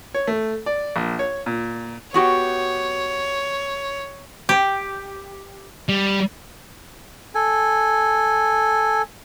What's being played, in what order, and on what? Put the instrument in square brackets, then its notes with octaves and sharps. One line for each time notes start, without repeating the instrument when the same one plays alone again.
[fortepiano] C#5
A3
D5
A#1
C#5
A#2
[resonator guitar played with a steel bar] B3 F#4 G4 [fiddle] C#5
[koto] G4
[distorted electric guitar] G3
[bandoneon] A4 G#5